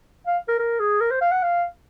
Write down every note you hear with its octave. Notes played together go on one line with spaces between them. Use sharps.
F5
A#4
A#4
G#4
A#4
C5
F5
F#5
F5